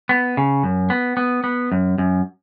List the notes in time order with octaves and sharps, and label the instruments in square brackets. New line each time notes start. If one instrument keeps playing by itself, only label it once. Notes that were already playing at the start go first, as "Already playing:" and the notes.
[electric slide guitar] B3
C#3
F#2
B3
B3
B3
F#2
F#2